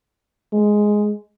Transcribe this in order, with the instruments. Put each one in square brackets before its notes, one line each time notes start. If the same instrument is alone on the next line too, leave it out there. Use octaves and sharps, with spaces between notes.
[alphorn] G#3